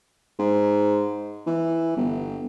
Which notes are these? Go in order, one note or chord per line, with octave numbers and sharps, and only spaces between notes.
G#2
E3
G1